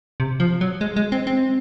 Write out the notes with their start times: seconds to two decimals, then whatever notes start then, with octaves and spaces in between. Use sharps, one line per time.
0.20 C3
0.40 F3
0.61 F#3
0.81 G#3
0.96 G#3
1.12 C4
1.27 C4